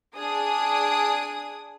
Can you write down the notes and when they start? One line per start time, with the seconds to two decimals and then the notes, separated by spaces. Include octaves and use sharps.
0.16 D4 G#4 D#6